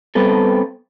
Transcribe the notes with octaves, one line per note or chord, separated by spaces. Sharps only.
G3 B3 C4 A4